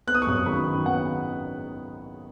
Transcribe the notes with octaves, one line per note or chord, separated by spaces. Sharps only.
B3 F#6
D#6
C#6
F#2 D#6
D#3 B5
D#3
B3 F#5